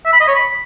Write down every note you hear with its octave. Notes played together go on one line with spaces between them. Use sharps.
E5
B5
D#5
C#5
B5